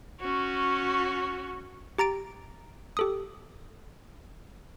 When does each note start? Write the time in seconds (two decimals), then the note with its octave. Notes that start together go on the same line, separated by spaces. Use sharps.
0.20 C#4 F#4
1.98 G4 A#5 A6 D7
2.97 G4 A4 D#6